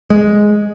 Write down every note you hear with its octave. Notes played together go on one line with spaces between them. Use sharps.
G#3